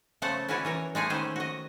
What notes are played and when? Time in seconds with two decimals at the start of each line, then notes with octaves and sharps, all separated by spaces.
0.22 C#3 A3 C5 F#5 A5
0.48 C#4 E4 F#4 B4 C#5 D5
0.65 E3 A#4 C#5
0.95 G#3 A3 G#4 G#5
1.10 D#3 C#4 E4 G4 C5
1.36 F#4 D#5